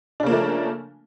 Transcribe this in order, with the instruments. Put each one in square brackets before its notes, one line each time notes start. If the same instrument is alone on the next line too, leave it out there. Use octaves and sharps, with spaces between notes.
[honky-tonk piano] D4
C#3
A#3
F3
A3